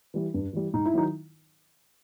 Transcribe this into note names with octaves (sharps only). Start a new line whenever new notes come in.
E3 G3
G2
E3 G3
G#2 D#4
E4
D#3 F#3 D#4